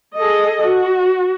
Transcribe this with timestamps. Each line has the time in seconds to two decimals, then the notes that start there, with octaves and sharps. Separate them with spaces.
0.16 G#4 A4 D#5
0.63 F#4